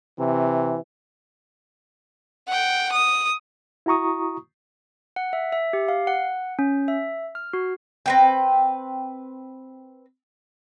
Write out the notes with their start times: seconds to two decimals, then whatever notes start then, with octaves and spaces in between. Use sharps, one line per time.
0.19 C3 E3
2.48 F#5 G5
2.92 D#6
3.86 E4 F#4 A#5 C#6 D#6
5.16 F#5
5.33 E5
5.52 E5
5.73 G4
5.89 F5
6.07 F#5
6.59 C#4
6.88 E5
7.35 F6
7.53 F#4
8.06 C4 B4 G5